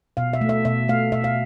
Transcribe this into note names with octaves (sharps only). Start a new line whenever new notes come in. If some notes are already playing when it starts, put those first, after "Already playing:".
B2 F5
E5
A3
E5
B2 E5
A3 F5
B2 E5
F5